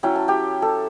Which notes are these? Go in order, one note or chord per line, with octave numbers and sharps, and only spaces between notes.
F#3 C#4 E4 G5
A5
G4 G5
A4 A5